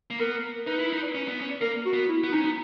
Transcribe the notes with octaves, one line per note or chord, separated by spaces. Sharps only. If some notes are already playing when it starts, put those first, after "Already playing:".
A#3
B3 A#4
D#4 B4
E4
D#4
C#4
B3
C#4
A#3 A#4
F#4
B3
E4
B3
C#4 D#4
B3